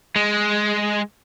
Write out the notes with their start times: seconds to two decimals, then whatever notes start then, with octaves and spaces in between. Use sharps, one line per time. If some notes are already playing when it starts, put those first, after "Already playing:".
0.16 G#3